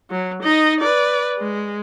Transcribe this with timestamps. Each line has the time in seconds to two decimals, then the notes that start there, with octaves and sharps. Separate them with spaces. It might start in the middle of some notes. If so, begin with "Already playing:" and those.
0.10 F#3
0.43 D#4 D#5
0.80 B4 D5
1.38 G#3